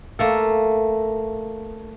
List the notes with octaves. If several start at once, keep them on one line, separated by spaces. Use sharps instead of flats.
A3 A#3 A4